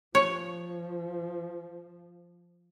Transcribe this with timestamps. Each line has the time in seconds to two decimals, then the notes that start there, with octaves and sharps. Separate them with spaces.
0.15 F3 C#5